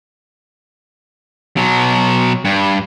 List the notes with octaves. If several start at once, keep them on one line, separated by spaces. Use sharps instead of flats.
B2 F#3
G2